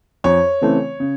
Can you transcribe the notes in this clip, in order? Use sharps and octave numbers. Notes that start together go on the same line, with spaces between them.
F2 C#5
C#3 E3 A3 C4
C#3